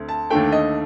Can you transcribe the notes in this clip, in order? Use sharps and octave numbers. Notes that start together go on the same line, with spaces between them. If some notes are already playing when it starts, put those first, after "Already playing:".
Already playing: D2 D3 A3 C4
A5
D#2 D3 A3 G5
D#5